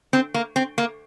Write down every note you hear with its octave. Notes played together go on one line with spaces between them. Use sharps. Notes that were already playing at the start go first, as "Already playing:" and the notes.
C4
A#3
C4
A#3